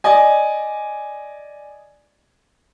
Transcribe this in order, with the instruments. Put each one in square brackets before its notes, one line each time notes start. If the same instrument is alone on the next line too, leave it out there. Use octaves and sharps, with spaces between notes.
[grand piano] D5 D#5 G#5